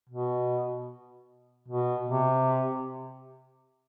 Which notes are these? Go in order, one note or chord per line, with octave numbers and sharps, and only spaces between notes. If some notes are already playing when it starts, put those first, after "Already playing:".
B2
B2
C3